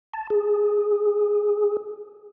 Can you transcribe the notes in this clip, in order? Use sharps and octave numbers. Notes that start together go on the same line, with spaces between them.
A5
G#4